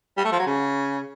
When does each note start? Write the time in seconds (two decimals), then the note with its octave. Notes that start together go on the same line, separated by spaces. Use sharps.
0.17 G3
0.25 A3
0.32 F3
0.39 F#3
0.46 C#3